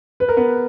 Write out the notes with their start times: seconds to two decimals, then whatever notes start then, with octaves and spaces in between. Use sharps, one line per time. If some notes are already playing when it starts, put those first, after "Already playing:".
0.20 B4
0.29 A#4
0.37 B3 B4